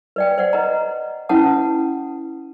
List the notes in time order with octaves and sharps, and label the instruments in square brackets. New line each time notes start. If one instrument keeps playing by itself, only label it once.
[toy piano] B4 D5 G5
C5 D5 F#5
B4 D#5 A#5
C#4 E4 B4 F#5 A5 D#6